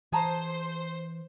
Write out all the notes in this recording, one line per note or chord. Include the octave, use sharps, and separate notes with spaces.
E3 G#4 C5 A5 A#5